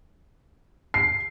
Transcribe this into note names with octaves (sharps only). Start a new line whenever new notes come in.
C7